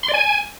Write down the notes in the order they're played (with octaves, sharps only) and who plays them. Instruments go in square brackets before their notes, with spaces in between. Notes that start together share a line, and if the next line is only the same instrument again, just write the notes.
[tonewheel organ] C6
D5
G#5